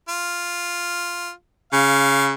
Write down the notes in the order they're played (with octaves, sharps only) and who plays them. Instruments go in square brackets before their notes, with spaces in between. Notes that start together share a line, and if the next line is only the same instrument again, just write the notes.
[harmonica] F4
[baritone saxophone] C#3 [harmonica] F5